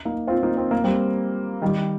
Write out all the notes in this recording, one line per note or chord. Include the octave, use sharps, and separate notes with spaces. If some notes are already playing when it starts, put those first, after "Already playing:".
A#3 D#4
C4 F4
A#3 D#4
C4
A#3
G3 C4
D#3 G3